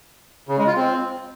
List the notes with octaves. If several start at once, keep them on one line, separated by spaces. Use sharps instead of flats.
C#3
G#3
F4
C4